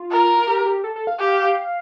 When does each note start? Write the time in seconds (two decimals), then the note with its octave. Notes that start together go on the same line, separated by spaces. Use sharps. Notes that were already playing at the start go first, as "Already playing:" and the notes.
Already playing: F4
0.11 A#4
0.38 F4
0.47 G4
0.66 G4
0.84 A4
0.96 A4
1.07 F5
1.19 G4